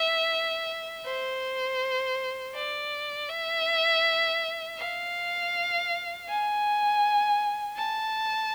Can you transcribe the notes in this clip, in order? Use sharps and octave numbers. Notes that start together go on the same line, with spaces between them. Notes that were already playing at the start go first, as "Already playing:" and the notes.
Already playing: E5
C5
D5
E5
F5
G#5
A5